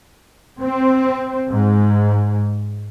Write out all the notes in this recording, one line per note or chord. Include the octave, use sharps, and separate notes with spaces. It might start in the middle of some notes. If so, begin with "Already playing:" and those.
C4
G#2